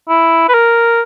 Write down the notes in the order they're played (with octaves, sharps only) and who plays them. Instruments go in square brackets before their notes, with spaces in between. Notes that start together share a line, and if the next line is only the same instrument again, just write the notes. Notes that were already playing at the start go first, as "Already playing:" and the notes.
[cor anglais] E4
B4
A#4